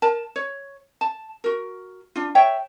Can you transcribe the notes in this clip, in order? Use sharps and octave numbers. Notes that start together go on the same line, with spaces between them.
A#4 A5
C#5
A5
F#4 A#4
D4 F4
C#5 E5 G5